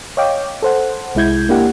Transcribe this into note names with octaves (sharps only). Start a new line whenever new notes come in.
C#5 D#5 F5 G5 D6
A4 C5 F#5
C2 G#3 E4 G6 G#6
A#3 D4 E4 G4 F#5